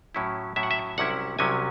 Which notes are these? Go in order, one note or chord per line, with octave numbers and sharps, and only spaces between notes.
A2 F#3 C#4 E4
A2 F#3 C#4 E4 E5
F#5
E5
C2 C3 F#3 C#4 E4 F#5
C2 C3 F#3 C#4 E4 G#5